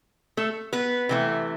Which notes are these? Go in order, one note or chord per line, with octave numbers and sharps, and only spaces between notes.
A3 A4
B3 B4
C3 E3 A3